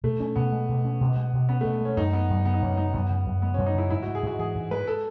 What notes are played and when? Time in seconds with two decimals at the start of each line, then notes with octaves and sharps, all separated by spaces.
0.04 B2 A3
0.20 C#4
0.36 B2 B3
0.52 G#3
0.69 B2
0.85 C#4
1.01 B2
1.17 G#3
1.33 B2
1.49 B3 C#4
1.61 B2 A3
1.73 B3
1.81 G#3 C#4
1.97 F#2 D#4
2.13 G#3 B3
2.30 F#2
2.45 C#3 B3
2.54 D#4
2.62 F#2 C#4
2.77 G#3 D#4
2.94 F#2 B3
3.10 C#3
3.26 F#2
3.42 G#3 B3
3.54 F#2 C#4
3.66 D#4
3.74 C#3 E4
3.90 G#2 E4
4.03 G#3 F#4
4.15 G#4
4.23 G#2 F#4
4.39 E3 G#4
4.55 G#2
4.71 G#3 B4
4.87 A4